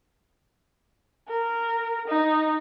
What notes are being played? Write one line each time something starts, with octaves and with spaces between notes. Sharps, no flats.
A#4
D#4